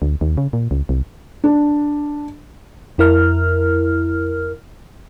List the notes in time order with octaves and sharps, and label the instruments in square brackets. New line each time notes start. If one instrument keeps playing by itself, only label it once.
[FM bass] D2
D#2
C#3
A#2
C#2
C2
[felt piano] D4
[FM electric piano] F2 E4 A#4 F6